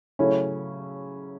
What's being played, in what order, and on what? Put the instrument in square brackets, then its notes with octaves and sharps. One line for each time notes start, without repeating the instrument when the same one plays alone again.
[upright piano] C#3 F#3 A3 C#4 E4